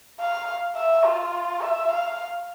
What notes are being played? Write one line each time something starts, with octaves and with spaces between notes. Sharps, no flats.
F5
E5
F4
E5
F5